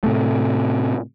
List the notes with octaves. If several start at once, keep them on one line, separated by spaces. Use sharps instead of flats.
A2 C3 A3